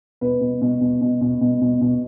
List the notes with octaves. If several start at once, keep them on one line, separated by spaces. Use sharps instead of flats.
B2 B4
B2
B2
B2
B2
B2
B2
B2
B2